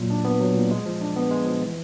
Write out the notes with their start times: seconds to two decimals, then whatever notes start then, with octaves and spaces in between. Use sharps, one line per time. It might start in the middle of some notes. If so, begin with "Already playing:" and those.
Already playing: A#2 F#3
0.10 D4
0.25 B3
0.40 F#3
0.55 A#2
0.71 G#3
0.86 F3
1.01 D4
1.16 B3
1.31 G#3
1.46 F3
1.62 E3